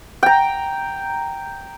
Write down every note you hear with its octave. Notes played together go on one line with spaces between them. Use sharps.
G5 A#5